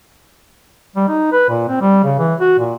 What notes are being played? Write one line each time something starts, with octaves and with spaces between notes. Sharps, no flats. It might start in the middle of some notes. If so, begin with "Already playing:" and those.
G3
D#4
B4
A#2
C4
G3
C#3
E3
F#4
A#2